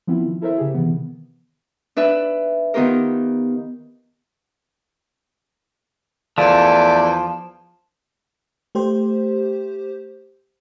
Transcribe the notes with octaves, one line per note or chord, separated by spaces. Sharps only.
F3 B3 C4 E4 F4
D#3
E4 A4 A#4 C5 E5
C#3 G4 G#4
C3 D#3 E3 B3
D4 B4 E5 E6
D#3 B3 F4 G4 A#4
E2 F3 A3 D5
A3 G4 C5